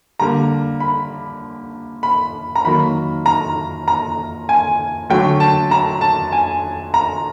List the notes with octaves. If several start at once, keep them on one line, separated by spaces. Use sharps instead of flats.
D3 G3 A#3 A#5
B5
B5
A#5
D#3 F#3 A#3 B5
A#5
A#5
G#5
D3 F#3 A3 G5
A5
A#5
A5
G#5
A#5